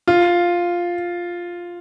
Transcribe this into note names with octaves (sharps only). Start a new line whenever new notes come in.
F4